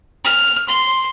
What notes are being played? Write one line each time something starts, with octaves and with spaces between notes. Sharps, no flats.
F6
C6